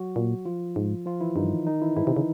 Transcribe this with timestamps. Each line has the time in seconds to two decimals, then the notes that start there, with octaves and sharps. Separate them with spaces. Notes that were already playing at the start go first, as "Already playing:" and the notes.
Already playing: F#3 F#4
0.16 A#2
0.45 F3 F4
0.76 G#2
1.06 F3 F4
1.21 E3 E4
1.36 G2 D#3 D#4
1.67 D#3 D#4
1.82 E3 E4
1.96 G#2 E3 E4
2.07 C3
2.17 C#3